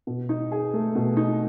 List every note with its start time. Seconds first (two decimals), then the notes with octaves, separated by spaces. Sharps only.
0.07 B2
0.29 D#4
0.52 G#4
0.73 A3
0.95 B2
1.17 D#4